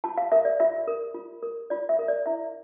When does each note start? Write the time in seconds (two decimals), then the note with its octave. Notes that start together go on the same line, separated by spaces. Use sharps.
0.04 F4 A5
0.18 F5
0.32 A#4 E5
0.45 D5
0.60 F4 E5
0.87 A#4
1.14 F4
1.43 A#4
1.70 F4 D5
1.89 E5
1.99 A#4
2.08 D5
2.26 E4 E5